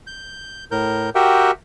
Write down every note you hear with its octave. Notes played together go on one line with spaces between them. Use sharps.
G6
A2 A#4 G6
F#4 G4 A#4 E5 F#5 G5